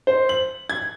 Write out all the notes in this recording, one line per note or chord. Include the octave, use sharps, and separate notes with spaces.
C5
F#7
G#6